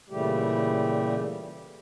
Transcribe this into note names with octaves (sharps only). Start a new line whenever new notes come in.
A#2 C#3 E3 G3 A3 G4